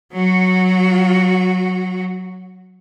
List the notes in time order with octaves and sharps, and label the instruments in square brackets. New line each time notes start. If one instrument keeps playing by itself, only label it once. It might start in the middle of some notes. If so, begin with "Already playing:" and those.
[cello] F#3 F#4